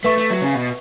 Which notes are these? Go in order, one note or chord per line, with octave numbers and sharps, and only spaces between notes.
A3 B4 E5 C#6
A3
F#3
C#3
B2